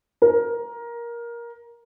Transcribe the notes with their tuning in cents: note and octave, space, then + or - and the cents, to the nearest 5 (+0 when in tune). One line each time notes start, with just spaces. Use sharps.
A#4 +15